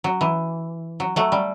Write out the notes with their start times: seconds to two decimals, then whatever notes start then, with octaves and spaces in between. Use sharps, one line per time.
0.04 F#3
0.21 E3
1.00 F#3
1.16 F#3 A3
1.32 G3